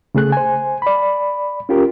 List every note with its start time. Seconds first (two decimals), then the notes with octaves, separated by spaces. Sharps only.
0.15 C#3 A3 G#4 F#6
0.32 C5 G#5
0.82 D5 B5
1.69 C#4 F4 G4 A#4